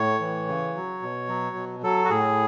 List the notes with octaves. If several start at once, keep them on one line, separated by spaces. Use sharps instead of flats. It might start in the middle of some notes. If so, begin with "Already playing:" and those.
Already playing: A2 C#5
E3
C#3
F#3
B2
F#3
B2
F#3 A4
F#4
A2 G#4